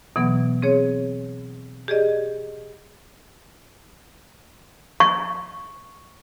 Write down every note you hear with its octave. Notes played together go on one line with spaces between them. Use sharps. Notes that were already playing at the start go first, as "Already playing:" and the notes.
B2 E3 F#3 B3
C4 G#4 C#5
G4 G#4 D5 D#5
C#6